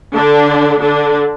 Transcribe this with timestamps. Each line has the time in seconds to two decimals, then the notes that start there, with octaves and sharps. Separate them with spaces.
0.15 D3 D4
0.81 D3 D4